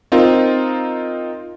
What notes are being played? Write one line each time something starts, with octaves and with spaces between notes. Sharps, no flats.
C4 D#4 F4 A#4